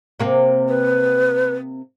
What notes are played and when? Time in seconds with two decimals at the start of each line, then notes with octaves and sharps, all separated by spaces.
0.20 C3 A#3 C4
0.69 B4